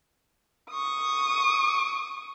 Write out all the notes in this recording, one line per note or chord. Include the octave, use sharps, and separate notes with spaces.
C#6 D#6